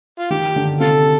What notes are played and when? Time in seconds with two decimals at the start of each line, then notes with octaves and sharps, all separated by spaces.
0.19 F4
0.30 D#3 G4
0.56 D3
0.80 C3 F4 A4